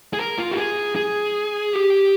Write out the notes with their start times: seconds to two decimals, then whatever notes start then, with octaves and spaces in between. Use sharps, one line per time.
0.13 G#4
0.19 A#4
0.38 F4
0.51 G4
0.57 G#4
0.96 G#4
1.73 G4